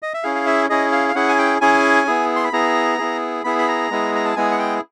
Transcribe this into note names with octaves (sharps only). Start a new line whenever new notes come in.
D#5
E5
C#4 E4 G#4 F5
F5
E5
C#4 E4 G#4 D#5
F5
F5
C#4 E4 G#4 F#5
G#5
G5
C#4 E4 G#4 G#5
B3 E4 G#4
C6
B5
B3 E4 G#4 A#5
B3 E4 G#4
B3 E4 G#4 B5
B5
A#5
G#3 B3 E4 G#4
A#5
A5
G#3 B3 E4 G#4 G#5
F#5
G5